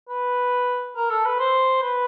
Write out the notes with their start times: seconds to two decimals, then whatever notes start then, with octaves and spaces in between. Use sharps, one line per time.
0.09 B4
0.96 A#4
1.10 A4
1.25 B4
1.39 C5
1.82 B4